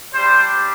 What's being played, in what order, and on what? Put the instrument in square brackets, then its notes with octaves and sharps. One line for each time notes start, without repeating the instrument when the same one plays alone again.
[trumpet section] G3 D4 G4 C5